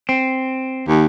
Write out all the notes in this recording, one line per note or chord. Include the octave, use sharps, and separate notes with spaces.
C4
D#2